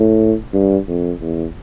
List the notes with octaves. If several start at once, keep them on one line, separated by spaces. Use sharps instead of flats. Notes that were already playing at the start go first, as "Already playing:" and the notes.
Already playing: A2
G2
F2
E2